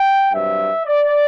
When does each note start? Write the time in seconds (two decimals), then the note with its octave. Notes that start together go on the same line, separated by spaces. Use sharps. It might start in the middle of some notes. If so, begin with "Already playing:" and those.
Already playing: G5
0.31 G2 F#3 C4 E5
0.86 D5